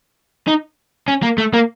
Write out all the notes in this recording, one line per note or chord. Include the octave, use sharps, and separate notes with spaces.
D#4
C#4
A#3
A3
A#3